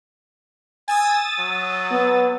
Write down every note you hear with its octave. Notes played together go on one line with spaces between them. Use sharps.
G#5 D#6 E6 A6
F#3
B3